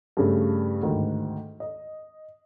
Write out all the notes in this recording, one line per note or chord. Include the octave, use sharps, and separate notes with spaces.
G2 C#3 A3
D2 G#2 D#3
D#5